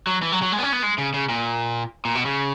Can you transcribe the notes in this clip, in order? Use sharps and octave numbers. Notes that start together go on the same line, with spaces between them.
F#3
E3
F#3
F#3
G#3
B3
C#4
B3
G#3
C#3
C#3
A#2
A#2
B2
C#3